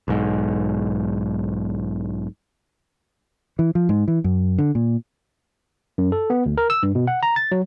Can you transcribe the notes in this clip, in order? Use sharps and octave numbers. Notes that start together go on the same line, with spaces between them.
B1 G#2
E3
F3
G#2
E3
F#2
D3
A#2
F#2
A4
B3
D2
A#4
E6
G2
B2
F#5
A#5
A6
F#3